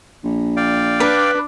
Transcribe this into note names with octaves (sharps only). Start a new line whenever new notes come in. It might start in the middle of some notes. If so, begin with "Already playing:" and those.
A#1
D5 F5 G5
D4 B4